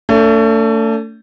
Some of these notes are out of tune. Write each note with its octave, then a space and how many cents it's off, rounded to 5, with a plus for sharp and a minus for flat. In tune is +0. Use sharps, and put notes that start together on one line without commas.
A3 +30 D4 -35